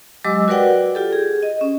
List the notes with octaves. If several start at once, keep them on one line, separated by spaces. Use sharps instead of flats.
F#3 G#3 G4 D#5 D6 E6
F#4 A#4 B4 D5 F#5 G5
F4 G4 A4
G#4
D#5
C#4